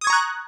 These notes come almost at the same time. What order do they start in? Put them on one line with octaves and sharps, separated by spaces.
D#6 G#6 C#6 A#5 F#6